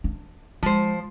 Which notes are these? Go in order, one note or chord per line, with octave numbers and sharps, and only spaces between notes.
D4
F3 G#3 C5